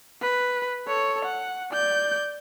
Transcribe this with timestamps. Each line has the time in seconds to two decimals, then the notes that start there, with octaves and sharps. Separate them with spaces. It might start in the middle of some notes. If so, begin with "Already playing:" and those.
0.21 B4
0.88 A4 C#5
1.25 F#5
1.72 D5 G6